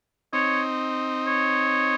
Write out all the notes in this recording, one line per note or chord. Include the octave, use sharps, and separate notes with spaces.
C4 D#4 C#5
C#5